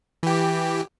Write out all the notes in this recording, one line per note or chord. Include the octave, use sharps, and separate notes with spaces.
E3 G4